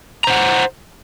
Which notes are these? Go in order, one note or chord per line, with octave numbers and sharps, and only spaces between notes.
C5 F#5 A#5